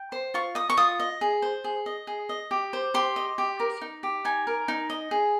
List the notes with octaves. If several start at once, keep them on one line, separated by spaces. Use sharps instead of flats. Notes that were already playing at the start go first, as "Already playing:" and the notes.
Already playing: G5
C5
F4 C#6
D#5 D#6
C#6
F4 D#6
D#5
G#4
C5
G#4
D#5
G#4
D#5
G4
C5
G4 C6
D#5
G4
A#4
D#4
G4
D#4 G#5
A#4
D#4
D#5
G#4